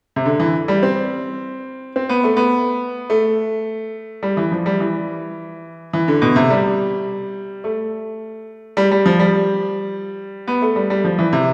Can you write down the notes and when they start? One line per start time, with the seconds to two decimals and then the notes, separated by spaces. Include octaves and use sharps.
0.16 C3
0.26 D3
0.40 E3
0.68 G3
0.83 C4
1.96 C4
2.09 B3
2.24 A3
2.37 B3
3.10 A3
4.23 G3
4.37 E3
4.52 F3
4.66 G3
4.80 E3
5.93 E3
6.08 D3
6.22 B2
6.36 C3
6.50 G3
7.64 A3
8.77 G3
8.91 G3
9.06 F3
9.19 G3
10.48 B3
10.62 A3
10.76 G3
10.90 G3
11.04 F3
11.19 E3
11.33 C3